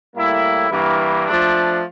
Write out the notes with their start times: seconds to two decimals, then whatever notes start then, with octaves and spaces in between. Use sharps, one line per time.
0.15 A2 G3 A#3 E4
0.70 G2 E3 A#3
1.26 F3 A3 D4